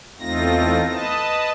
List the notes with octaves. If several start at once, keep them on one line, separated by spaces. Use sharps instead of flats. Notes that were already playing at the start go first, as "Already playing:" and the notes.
E2 A3 C4 D#4 F4 A#6
B4 D#5 A5